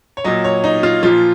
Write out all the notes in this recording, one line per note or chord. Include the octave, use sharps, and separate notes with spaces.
C#5
A#2 F#3 D#5
C#5
D#4
F4
A#2 F3 F4